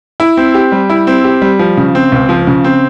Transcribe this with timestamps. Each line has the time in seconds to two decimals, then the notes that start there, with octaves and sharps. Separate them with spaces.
0.20 E4
0.37 C4
0.54 G4
0.72 G3
0.90 E4
1.07 C4
1.24 G4
1.42 G3
1.59 F3
1.77 C#3
1.95 C4
2.12 C#2
2.29 F3
2.47 C#3
2.64 C4